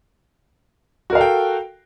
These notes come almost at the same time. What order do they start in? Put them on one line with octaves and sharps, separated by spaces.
F#4 A#4 F5 A4 G5